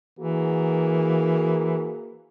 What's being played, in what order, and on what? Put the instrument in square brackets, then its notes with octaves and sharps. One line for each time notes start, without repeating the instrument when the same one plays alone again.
[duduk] E3 [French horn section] A#3 F#4 G#4